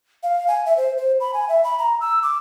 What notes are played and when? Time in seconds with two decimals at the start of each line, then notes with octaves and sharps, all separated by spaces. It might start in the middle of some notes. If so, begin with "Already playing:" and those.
0.23 F5
0.48 G#5
0.66 E5
0.77 C5
0.98 C5
1.20 B5
1.34 G#5
1.49 E5
1.64 B5
1.79 A#5
2.01 E6
2.23 D6